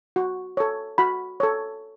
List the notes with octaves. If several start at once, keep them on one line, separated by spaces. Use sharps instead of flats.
F#4
A4 C#5
F#4 B5
A4 C#5